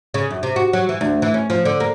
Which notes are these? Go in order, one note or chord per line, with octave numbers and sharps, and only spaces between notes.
C#3
F#2
C3
F#4
F#3
E3
D2
E3
C#4
F3
D3
A#3